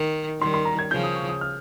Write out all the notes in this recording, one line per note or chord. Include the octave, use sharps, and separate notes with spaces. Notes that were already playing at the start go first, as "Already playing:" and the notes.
Already playing: D#3
D#3 G3 C6
C6
A#5
G#6
C#3 F3 G6
D#6
C#6
D#6
F6